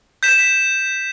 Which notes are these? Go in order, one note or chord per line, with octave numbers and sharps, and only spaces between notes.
G6 B6 E7